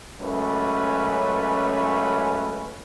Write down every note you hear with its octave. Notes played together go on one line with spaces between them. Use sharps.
C#2 F#2 A3 C#4 B4